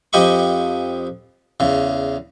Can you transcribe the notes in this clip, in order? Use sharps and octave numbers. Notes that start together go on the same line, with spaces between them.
F2 F3 G4 D#5 B5 C#6
E2 C#3